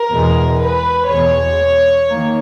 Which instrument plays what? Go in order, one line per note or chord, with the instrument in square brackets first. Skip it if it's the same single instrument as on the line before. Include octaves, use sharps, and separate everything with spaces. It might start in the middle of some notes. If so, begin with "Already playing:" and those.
Already playing: [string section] A#4
E2 B2 G#3
B4
E2 B2 G#3 C#5
D#3 A#3